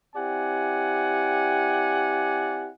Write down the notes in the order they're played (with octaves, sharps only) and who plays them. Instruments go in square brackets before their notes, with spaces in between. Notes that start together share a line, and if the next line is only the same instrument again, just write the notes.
[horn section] C4 E4 G4 D5 F#5 G#5